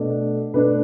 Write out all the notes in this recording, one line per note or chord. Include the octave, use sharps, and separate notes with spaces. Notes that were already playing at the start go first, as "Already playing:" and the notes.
Already playing: B2 A3 D4
B2 A3 D4 B4